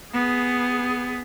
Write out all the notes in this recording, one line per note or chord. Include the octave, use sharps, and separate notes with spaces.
B3 G#4